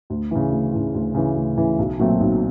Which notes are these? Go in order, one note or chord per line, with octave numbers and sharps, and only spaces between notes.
D2
C#3 E3
D2
C#3 E3
D2
C#3 E3
D2
C#3 E3
B1
A#2 F#3 A3 C4
B1